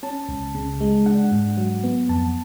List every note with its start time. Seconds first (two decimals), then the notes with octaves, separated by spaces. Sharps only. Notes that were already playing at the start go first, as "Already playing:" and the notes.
0.03 C#4 A5
0.29 C#2
0.55 C#3
0.81 G#3
1.06 D4 F#5
1.32 G#2
1.57 F#3
1.83 B3
2.09 F2 A5